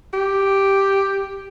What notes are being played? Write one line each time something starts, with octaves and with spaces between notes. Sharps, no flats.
G4